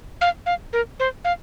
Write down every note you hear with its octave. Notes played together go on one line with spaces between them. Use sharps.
F5
F5
A#4
C5
F5